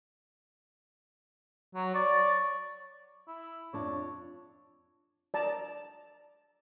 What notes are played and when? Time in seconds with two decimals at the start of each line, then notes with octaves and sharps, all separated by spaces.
1.75 F#3
1.95 C#5 D5
3.28 E4
3.73 F2 D4 C#5
5.34 D5 A5 A#5